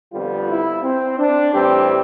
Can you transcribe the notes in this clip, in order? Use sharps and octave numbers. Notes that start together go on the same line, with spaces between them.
F2 D3 G3 B3 F4
E4
C4
D4
A2 E3 G3 C4 G4